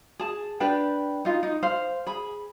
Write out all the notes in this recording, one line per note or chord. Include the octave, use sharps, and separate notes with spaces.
G#4 A5
D4 G4 B4 G5
D#4 F4
D#4
C5 F5
G#4 B5